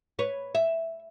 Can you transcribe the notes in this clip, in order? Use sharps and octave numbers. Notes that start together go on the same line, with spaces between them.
B4 C#5
E5